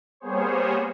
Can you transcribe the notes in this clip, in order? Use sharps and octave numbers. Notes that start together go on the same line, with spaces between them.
G3 A#3 B3 G#4 C5 C#5